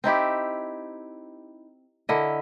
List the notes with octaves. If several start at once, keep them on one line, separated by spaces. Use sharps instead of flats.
C4 D#4 E4 G4
D3 E4 A#4 D#5